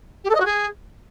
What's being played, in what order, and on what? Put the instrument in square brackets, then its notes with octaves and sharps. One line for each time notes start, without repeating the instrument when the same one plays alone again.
[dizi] G4
A4
D#5
F#4
G#4